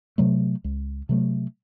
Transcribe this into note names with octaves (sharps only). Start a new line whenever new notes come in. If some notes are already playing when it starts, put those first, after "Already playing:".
C3 F#3 A3
C#2
C3 F#3 A3